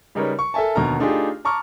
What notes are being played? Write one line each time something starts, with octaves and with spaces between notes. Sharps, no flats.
C#3 G3 D#4 A#4 B4 C#5
C#6
A4 A#4 E5 G#5 A5
D#2 B2 D3 A#5 F6
A3 D4 D#4 F4 G4 G#4
A5 A#5 C#6 D6 F6